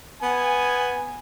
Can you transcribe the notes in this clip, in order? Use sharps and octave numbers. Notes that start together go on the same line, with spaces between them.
B3 G#5